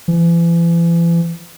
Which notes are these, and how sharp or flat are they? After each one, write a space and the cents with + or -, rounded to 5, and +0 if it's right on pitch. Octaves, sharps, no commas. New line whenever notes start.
E3 +40